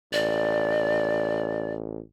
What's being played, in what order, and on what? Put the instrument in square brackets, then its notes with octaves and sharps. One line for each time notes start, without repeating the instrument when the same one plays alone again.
[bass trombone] A1 [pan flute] D5